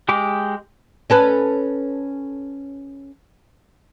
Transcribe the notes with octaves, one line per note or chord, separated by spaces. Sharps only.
G#3 G4 D6
C#4 A4 B4